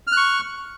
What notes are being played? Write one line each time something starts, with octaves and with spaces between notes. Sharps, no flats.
C#6 F6 F#6